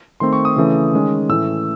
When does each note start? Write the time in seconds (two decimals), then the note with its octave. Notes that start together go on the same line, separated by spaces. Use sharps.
0.20 D#3 A3 C4 C6
0.33 C#6
0.45 D#6
0.56 C#3 E3 A3 C#4
0.94 D#3 G#3 C#4
1.29 A2 E3 A3 C#4 E6